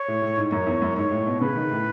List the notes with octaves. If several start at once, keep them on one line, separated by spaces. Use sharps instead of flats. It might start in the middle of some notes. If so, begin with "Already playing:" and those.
Already playing: C#5
A2
A2
G#2
F#2 C#5
E2
F#2
G#2 C#5
A2
B2
C#3 B4
D#3
A2